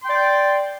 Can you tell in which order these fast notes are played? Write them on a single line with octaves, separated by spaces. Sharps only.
C6 G5 D5